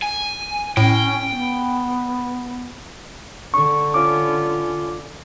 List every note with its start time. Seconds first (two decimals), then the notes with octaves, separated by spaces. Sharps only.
0.02 G#5
0.77 A2 C#4 G5
1.30 B3
3.54 D3 C#6
3.94 C#4 F4 D6